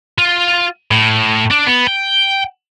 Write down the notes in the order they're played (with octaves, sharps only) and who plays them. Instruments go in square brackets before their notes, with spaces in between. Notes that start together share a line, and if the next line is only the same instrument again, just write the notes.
[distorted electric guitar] F4
A2
D4
B3
G5